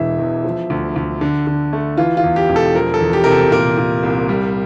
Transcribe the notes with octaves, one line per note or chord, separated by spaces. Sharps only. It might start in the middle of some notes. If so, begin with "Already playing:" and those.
Already playing: E1 E3 E5
E2
F3
D2
D2
D3
D3
A3
E3 F4
F4
E2
G4
E1
A4
F3 A#4
A4
E2
G4
C3 A#4
A4
A#2 A#4
A#2
C2
G3